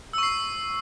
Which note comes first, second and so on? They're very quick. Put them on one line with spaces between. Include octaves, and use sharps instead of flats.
E6 C#6 C7